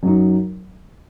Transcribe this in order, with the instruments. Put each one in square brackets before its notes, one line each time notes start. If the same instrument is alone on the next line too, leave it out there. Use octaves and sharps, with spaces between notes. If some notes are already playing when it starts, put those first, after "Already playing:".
[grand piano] F#2 F#3 D#4